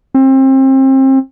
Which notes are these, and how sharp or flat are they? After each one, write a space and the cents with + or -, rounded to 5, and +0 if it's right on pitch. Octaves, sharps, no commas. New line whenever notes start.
C4 +30